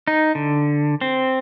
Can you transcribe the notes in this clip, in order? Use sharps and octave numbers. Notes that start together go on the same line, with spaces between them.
D#4
D3
C4